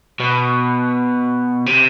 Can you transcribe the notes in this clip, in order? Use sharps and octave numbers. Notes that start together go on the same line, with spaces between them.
B2
C3